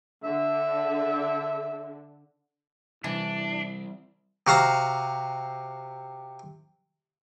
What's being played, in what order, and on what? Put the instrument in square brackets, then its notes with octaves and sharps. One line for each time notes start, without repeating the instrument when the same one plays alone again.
[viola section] D3 [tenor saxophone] E5
[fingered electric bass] C3 G3 [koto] E3 [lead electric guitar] D4 [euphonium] E4
[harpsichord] C3 F#4 F5 A#5